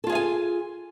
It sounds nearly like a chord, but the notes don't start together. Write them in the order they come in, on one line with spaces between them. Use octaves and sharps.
A4 F4 G#4 F5 G#5